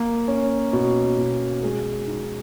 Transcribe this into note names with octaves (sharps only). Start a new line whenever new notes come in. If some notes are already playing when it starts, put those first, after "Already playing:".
Already playing: A#3
C#4
B2
B2
G#3
D#4